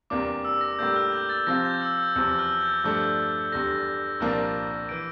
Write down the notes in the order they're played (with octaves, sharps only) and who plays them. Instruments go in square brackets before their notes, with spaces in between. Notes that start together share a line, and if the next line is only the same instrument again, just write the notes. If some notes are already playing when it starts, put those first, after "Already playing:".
[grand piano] E2 C3 G3 A#3 D4 [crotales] D6
[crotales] D6
E6
A#6
[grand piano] A2 G3 A#3 D4 [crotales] G6
[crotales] F6
G6
A6
[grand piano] C3 F3 C4 F4 [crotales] A#6
[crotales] G6
E6
E6
[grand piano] E2 C3 F3 C4 [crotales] E6
[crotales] F6
G6
[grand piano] G2 F3 A3 D4
[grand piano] E2 D3 G3 [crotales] A#6
[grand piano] C2 A#2 F3 A#3 D4
[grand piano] E3 [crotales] D7